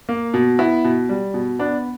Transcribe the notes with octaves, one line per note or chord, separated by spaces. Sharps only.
A#3
B2
B3 E4
B2
G3
B2
B3 D4